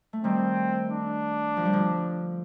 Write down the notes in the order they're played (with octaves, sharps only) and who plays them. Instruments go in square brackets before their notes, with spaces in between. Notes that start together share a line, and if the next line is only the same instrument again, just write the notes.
[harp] A3
[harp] D#3 G3 [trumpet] C4
[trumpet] D4
[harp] F3
G3
D3 F3